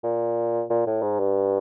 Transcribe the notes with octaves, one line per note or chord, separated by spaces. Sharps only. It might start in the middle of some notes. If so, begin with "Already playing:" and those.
A#2
A#2
A2
G#2
G2